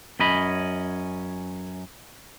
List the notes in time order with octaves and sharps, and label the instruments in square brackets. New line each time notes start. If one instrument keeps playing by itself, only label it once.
[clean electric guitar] F#2 C#4 D#5 B5